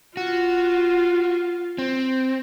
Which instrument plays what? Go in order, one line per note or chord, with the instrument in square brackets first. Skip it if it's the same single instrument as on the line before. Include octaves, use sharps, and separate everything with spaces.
[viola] F4 [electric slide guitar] F#4
[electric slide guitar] C4